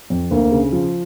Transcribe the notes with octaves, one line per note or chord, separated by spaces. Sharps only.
F2
D2 A#3
C#3
F3